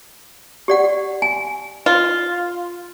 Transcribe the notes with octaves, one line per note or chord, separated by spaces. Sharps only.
G4 D5 F#5
G#5
F4